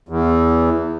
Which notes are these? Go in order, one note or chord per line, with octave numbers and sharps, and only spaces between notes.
E2